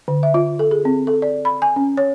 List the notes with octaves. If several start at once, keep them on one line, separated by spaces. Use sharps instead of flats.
D3
E5
F4
A4
G#4
C4
A4
D5
B5
G#5
C#4
C#5